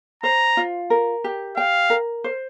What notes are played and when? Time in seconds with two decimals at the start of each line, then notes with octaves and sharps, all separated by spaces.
0.23 C5 A#5
0.57 F4
0.90 A#4
1.24 G4
1.57 F5 G5
1.90 A#4
2.24 C5